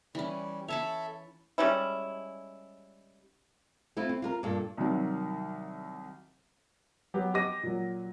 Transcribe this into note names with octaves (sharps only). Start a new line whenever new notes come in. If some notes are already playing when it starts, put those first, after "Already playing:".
E3 G3 C#4
A4 C#5 E5 A5 B5
G3 G#3 C#4 E4
A3 C4 E4 F4
C4
F4 F#4 A#4
G2 A#2 A4
C2 D#3 F#3
F#3 B3 G4
G4 D#5 D6 A#6 D#7
A#2 F#3